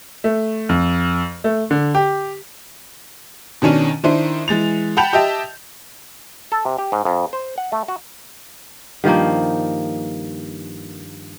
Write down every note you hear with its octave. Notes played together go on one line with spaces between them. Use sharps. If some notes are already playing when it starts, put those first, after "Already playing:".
A3
F2
A3
D3
G4
B2 D#3 C#4 D4 D#7
D#3 D4 E4 C5 D#7
E3 G#3 A6 F7
F#5 G5 A5 B5 G6 F7
G4 D#5 E5 G5 A5
A4
C3
G4
G#2
F2
C5
F#5
A3
F#4
G2 D#3 F3 A#3